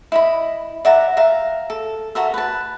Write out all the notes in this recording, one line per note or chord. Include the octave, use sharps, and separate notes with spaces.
E4 D#5 B5
D5 E5 F#5 A#5
E5 F5 A#5
A4
F#4 A4 A#4 E5
B4 A5